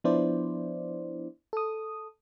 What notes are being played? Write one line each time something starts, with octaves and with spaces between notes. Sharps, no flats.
F3 B3 D4 E4 C5 D5
A4 D#6